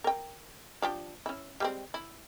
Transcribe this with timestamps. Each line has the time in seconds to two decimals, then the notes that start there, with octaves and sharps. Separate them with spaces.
0.04 A#4 G5
0.82 F3 D4 G4
1.26 C#4 E4
1.60 G3 G#3 C4
1.94 E4